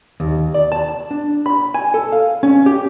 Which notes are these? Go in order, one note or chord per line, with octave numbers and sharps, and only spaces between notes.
D#2
D5
A5
D4
B5
G#5
A4
F5
C#4
G4